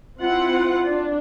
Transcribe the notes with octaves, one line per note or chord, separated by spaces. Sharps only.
C4 E4 F4 F#5
D4